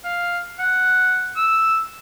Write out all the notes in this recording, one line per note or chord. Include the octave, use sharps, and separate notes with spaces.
F5
F#5
E6